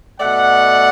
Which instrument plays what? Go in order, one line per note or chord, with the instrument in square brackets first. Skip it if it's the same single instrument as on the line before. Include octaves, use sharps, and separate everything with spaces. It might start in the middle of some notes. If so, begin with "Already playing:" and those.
[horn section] B2 A3 D5 F#5